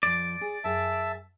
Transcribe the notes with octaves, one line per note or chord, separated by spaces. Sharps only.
F2 F3 D5
G#4
F#2 G#4 E5 A5